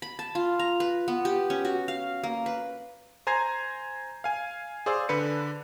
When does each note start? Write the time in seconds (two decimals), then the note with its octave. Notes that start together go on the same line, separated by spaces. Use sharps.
0.02 B5
0.19 A5
0.35 F4
0.59 A#5
0.80 B4
1.08 B3
1.25 G4
1.50 C#4
1.65 F#4
1.88 F5
2.23 A#3
2.46 B4
3.27 C5 G#5 A#5 G#6 C7
4.24 F5 G#5
4.86 G#4 C5 D5 F5 E6
5.09 D3 D4 B4 C#7